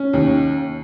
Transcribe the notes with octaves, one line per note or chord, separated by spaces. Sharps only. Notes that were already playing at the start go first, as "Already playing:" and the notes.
Already playing: C#4
D#2